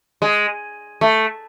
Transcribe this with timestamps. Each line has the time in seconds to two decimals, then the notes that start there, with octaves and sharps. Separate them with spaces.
0.22 G#3
1.01 A3